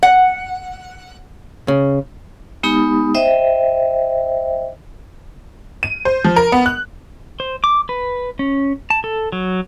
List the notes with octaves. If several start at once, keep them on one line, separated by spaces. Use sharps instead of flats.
F#5
C#3
G#3 B3 D#4 G4 B5 D#6
C5 D#5 E5 G5
D#7
C5
F3
A#4
B3
F#6
C5
D6
B4
C#4
A5
A4
F#3